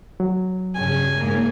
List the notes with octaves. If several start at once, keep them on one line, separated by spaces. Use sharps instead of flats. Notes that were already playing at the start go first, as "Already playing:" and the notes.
F#3
G2 C#3 G#5
G#2 A#3